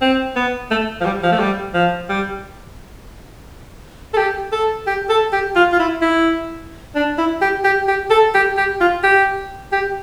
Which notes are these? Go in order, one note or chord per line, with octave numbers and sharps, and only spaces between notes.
C4
B3
A3
F3
G3
F3
A3
G3
F3
G3
A4
G4
A4
G4
A4
G4
F4
F4
E4
E4
D4
E4
G4
G4
G4
A4
G4
G4
F4
G4
G4